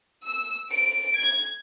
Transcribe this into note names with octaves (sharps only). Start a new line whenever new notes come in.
E6
D7
G#6